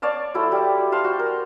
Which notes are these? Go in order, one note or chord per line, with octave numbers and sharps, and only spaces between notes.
C#5 D5 F5 A5
F#3 E4 A4 C5
G3
C5 F5 A5 C6
F#4
A#4